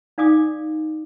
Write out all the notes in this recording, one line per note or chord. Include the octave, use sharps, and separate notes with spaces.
D#4 D5 F5 G#5 D6 D#6